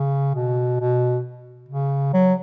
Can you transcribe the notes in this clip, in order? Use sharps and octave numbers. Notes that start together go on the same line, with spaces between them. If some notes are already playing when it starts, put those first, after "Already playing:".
Already playing: C#3
B2
B2
C#3
F#3